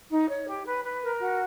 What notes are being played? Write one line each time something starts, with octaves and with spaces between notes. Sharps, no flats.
D#4
C#5
G4
B4
B4
A#4
F#4